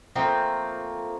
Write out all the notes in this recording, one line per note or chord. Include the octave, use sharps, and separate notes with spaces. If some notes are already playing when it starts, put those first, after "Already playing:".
F3 A3 A#3 C4